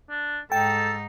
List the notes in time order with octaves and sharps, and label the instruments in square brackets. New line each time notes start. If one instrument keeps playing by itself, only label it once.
[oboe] D4
[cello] G#2 D#4 [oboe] A4 [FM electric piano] G5